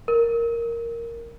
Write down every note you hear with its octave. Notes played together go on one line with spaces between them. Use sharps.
A#4